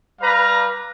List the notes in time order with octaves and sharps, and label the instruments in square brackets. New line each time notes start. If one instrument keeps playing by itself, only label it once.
[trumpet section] G3 B4 F5 A#5